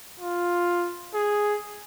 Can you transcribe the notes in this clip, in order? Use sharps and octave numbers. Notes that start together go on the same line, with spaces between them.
F4
G#4